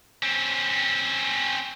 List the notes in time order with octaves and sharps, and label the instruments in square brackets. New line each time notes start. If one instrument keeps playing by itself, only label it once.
[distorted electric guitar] C4 C#4